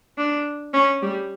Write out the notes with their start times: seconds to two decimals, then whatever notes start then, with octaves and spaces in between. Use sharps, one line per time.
0.18 D4
0.74 C#4
1.02 G3